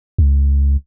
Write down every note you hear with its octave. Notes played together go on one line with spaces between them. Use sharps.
C#2